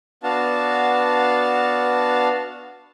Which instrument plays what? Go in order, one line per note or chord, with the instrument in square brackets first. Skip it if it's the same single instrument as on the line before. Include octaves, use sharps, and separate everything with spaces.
[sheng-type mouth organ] B3 D4 F#4 F5 A5